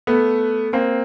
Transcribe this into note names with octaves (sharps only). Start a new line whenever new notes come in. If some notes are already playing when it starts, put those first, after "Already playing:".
A3 B3
A#3 C4